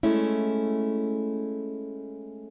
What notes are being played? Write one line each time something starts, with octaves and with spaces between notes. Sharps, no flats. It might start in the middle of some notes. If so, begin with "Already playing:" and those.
G#3 A3 C#4 E4